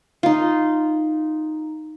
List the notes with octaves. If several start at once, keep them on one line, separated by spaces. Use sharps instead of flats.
D#4 F4